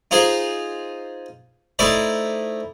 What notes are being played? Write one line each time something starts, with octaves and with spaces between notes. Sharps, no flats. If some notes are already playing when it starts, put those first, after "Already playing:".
D#4 F4 G#4 C5 C6
A3 D#4 E4 C5 D5